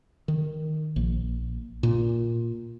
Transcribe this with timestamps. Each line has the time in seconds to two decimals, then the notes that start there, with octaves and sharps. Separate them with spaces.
0.28 D#3
0.96 A#1
1.83 A#2